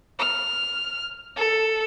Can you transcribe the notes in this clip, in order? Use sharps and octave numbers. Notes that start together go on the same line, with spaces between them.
F6
A4